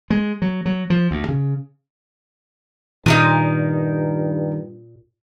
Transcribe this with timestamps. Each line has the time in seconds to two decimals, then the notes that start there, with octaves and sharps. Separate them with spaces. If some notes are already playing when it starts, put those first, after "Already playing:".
0.10 G#3
0.42 F#3
0.66 F#3
0.90 F3
1.11 D2
1.29 C#3
3.06 G2 A#2 D#3 D#4 A#4 D#6